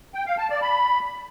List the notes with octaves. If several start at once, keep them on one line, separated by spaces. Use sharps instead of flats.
G5
F5
A5
D5
B5